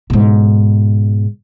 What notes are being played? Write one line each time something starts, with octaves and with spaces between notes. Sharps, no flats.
G#2 B2